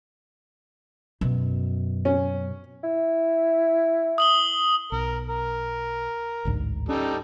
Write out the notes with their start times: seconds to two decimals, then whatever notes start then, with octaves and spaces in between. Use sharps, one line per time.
1.21 F#2 B2
2.05 C#4
2.84 E4
4.18 D#6 F#7 G7
4.92 B1 A#4
5.28 A#4
6.45 A1 D2 G#2
6.89 G3 C#4 D#4 A4